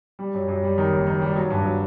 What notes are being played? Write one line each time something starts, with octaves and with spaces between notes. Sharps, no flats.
G3
F#2
F#2
G3
D#3
F#1
D#3
G3
F#3
G2
F#3